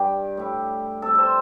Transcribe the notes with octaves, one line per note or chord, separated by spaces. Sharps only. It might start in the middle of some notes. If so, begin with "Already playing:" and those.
Already playing: G2 G3 G4
A2 G3
C3 G3 A4
A4 C5